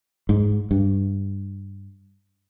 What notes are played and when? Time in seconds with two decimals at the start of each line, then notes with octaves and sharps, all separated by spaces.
0.29 G#2
0.71 G2